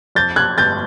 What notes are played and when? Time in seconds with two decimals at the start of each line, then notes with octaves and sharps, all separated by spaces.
0.15 F2 G6 A6
0.36 F#6 G#6
0.57 G1 G6 A6